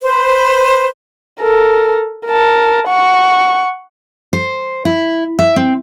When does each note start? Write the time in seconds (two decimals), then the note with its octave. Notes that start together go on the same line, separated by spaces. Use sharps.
0.02 B4 C5
1.41 A4 A#4
2.26 A#4 A5
2.88 F#5 C#6
4.33 C5
4.85 E4
5.39 E5
5.56 C4